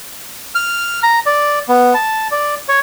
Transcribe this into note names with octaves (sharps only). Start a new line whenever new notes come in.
F6
A#5
D5
B3
A5
D5
C#5